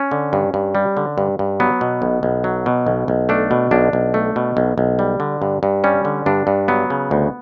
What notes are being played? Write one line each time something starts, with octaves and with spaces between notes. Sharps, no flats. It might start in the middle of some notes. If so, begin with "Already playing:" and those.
Already playing: C#4
D3
G2
G2
G3
D3
G2
G2
F#3 B3
B2
B1
B1
F#3
B2
B1
B1
A3 D4
B2
B1 D4
B1
A3
B2
B1
B1
G3
D3
G2
G2
G3 C#4
D3
G2 D4
G2
F#3 B3
C#3
D2